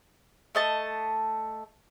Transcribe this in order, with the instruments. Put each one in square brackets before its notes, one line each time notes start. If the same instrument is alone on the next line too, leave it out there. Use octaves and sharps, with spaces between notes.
[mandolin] A3 D#5 A5